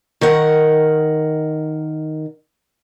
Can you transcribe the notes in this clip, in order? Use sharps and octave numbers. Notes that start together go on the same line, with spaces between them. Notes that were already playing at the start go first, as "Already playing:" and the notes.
D#3 A#4 F#5